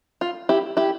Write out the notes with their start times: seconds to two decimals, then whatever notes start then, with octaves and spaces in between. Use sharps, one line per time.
0.21 F4
0.49 E4 G4
0.77 E4 G4